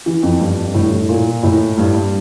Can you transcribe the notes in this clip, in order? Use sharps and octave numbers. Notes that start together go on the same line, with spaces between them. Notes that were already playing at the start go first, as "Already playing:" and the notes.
E3
F2
G2
A2
A2
A#2
A2
G2
G2